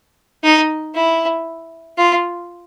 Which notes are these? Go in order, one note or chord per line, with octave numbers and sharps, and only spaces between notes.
D#4
E4
F4